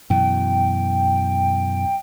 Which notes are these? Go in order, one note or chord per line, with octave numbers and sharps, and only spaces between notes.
F#2 B2 E3 G5